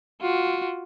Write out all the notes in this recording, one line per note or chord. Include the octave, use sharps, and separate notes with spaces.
F4 F#4